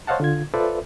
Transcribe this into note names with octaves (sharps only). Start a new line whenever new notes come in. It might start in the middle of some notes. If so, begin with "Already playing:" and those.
C5 C#5 D#5 F5 F#5 A5
D3 F4 G#6
F4 A4 B4 C5 D5 E5